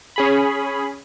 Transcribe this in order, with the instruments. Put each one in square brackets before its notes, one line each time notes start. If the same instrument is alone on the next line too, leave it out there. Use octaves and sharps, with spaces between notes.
[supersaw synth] C#4 G#4 B5